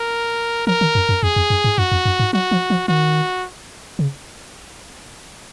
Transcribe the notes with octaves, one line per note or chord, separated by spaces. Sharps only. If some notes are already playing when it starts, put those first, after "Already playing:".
Already playing: A#4
F3 A#4
D#3
F#2
F#2
F2 G#4
F2
F#2
G#2
F#2 F#4
F2
F#2
G#2
F#3 F#4
F3
F3
D#3 F#4
C#3